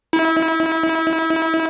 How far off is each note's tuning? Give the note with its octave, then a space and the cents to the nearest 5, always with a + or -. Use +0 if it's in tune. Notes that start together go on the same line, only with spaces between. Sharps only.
E4 -30